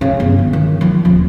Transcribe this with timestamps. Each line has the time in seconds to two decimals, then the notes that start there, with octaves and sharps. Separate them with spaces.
0.01 C#3
0.20 G1
0.39 B3
0.53 D#3
0.81 F3
1.05 D#1